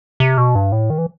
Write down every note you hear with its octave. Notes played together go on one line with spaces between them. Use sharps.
C3
B2
G2
A2
D#3
E3